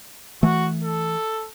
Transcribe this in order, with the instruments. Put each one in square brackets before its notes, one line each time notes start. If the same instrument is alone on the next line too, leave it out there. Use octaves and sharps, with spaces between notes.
[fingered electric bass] E3 A3 [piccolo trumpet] F#4
[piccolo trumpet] A4